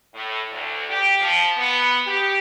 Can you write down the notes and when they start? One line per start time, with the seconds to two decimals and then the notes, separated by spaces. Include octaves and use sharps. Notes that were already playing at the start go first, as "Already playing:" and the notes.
0.14 A2
0.52 D2
0.90 G4
1.20 F3
1.56 B3
2.07 G4